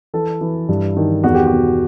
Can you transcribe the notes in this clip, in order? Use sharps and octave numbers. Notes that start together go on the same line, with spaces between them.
E3 A4
E3
G2
D#3
E2 F#4
G4
F#4
B2